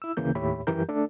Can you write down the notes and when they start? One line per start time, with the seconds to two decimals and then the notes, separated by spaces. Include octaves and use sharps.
0.02 E4 E6
0.17 D2 C#3 E3 A#3 G6
0.35 D#2 A2 G4 C#5 E5 B5
0.67 F#2 E3 G3 G4 A#4 G6
0.89 A3 D4 A4